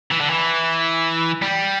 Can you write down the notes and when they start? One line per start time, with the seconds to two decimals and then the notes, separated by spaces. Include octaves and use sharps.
0.11 E3
0.21 D3
0.30 E3
1.42 G3